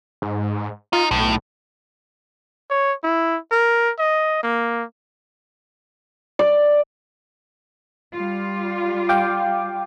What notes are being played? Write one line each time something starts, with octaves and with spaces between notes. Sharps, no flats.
G#2
D#4 F4
B1 A2
C#5
E4
A#4
D#5
A#3
D5
G3 F4
F5 G5 D6